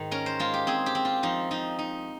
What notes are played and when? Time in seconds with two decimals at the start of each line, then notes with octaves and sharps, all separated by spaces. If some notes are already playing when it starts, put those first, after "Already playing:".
Already playing: G#2 D#3
0.11 C#4 A#4
0.26 C5
0.39 G#3 F4
0.54 G4
0.67 C4 G#4
0.86 G4
0.95 C4
1.05 F4
1.23 F3 D#4
1.51 F3 D#4
1.79 D#4